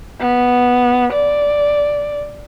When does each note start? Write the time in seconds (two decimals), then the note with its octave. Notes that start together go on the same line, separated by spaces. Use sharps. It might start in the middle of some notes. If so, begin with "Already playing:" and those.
0.21 B3
1.13 D5